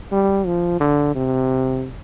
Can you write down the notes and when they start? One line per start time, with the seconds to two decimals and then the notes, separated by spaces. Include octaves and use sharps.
0.12 G3
0.46 F3
0.80 D3
1.15 C3